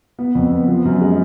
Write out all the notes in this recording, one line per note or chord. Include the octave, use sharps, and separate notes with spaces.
B3
F2
B3
F3
F#2
G#3